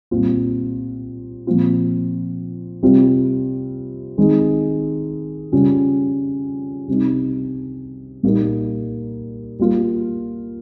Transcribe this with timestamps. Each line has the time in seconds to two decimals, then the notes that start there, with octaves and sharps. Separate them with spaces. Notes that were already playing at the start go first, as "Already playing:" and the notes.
0.11 A#2 G3 C4 F4
1.47 A#2 F3 C4 F4
2.82 C3 G3 C4 F4
4.18 D#3 G#3 C4 D#4
5.52 C#3 G3 C#4 F4
6.88 C3 G3 C4 D#4
8.23 A#2 G3 A#3 D#4
9.59 G3 A#3 F4